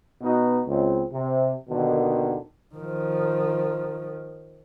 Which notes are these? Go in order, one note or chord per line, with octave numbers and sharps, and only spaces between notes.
B2 B3 D#4 F#4
C#2 C4
C3
D#2 B2 D3 D#3
D#3 F3